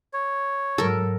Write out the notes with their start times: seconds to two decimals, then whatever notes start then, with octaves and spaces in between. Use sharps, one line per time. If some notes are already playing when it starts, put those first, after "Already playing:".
0.13 C#5
0.78 G#2 F#3 A4 A#4